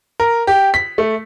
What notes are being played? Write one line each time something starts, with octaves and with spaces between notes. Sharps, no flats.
A#4
G4
B6
A3